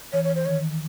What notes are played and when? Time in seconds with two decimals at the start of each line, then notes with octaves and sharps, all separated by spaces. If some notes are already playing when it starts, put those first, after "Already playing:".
0.12 E3 C#5
0.24 C#5
0.35 C5
0.45 D#3 C#5